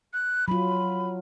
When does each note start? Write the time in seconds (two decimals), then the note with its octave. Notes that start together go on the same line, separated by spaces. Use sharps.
0.13 F#6
0.48 F#3 F4 B5